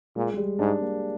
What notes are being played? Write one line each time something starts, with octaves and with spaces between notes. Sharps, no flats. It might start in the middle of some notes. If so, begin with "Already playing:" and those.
A#2 G#3
G#3
G3
G#2 D4
A#3